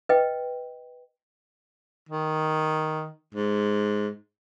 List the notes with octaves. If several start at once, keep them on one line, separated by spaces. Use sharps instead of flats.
B4 D#5 G5
D#3
G#2